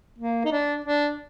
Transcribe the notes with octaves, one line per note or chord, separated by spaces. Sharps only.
A#3
D#4
D4
D4